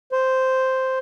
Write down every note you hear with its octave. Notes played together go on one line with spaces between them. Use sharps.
C5